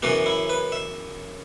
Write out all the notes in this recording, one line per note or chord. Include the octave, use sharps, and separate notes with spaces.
F#2 C#3 E3 B3 F#4
E4
B4
E5